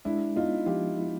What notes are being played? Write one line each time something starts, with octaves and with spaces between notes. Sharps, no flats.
G#3 D4 E4
B3 D#4 F4
F3 F4 G4
E4